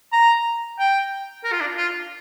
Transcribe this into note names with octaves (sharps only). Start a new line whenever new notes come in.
A#5
G5
A#4
F4
D4
F4